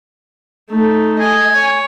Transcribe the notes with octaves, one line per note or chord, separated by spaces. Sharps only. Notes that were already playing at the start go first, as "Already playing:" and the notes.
A3 D#4
D#5 G#5
C#5